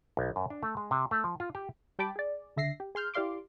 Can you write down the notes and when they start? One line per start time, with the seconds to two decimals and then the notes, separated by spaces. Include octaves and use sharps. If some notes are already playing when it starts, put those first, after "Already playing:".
0.17 B1
0.36 F#2
0.50 D4
0.63 A3
0.77 G#3
0.91 C3
1.11 A3
1.24 F3
1.40 F4
1.55 G4
1.99 G3 G5 A5 B5 D6
2.16 G#4 D5
2.56 C#2 D3 E5 A#6 C7
2.80 G4
2.95 G#4 C6 F6 G6
3.14 E4 G4 D5 F5 C6 D6